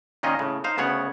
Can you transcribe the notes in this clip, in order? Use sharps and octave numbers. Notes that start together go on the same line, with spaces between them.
A#2 D#3 C#4 F4 D#5
A2 C#3
D#4 C5 F5
D2 C#3 B3 C#5 F#5